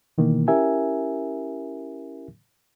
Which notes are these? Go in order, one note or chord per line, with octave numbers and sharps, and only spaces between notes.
B2 D#3 E3 A#3
C#4 E4 G4 A#4 E5 G#5